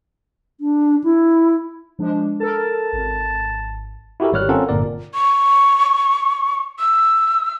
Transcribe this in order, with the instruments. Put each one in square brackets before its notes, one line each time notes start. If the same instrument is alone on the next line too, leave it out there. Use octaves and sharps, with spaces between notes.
[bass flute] D4
E4
[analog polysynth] F3 G#3 D4
[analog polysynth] A4 A#4 [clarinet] A5
[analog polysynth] G#1
[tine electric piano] E4 F#4 G4 A4 A#4
G#1 G3 C#5 F6 F#6
C4 C#4 F4 A4 A#4 F#5
G1 A#2 A#4 D5
[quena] C#6
E6